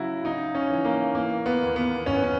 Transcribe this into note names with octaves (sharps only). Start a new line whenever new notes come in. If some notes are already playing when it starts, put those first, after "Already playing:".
Already playing: C#3 F#3 E4 F#4
C#3 D#4
C#4
E3
A#3
E3 A#3
B3
D#2
B3
F#2 C#4
B3
C#4